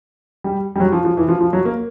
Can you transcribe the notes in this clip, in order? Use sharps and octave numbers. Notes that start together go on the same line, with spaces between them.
G3
G3
F#3
F3
F3
E3
F3
F3
F#3
A#3